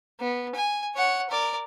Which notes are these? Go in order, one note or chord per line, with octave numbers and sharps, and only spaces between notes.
B3
G#5
C#5 F#5
A#4 D5